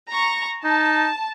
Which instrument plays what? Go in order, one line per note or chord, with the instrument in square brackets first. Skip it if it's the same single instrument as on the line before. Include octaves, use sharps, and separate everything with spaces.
[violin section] A#5 C#6
[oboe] D#4 [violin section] A5